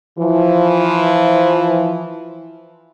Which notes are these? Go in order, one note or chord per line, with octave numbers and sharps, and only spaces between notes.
E3 F3